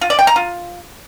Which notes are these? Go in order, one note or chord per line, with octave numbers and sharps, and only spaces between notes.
F4
D5
G5
A#5
F4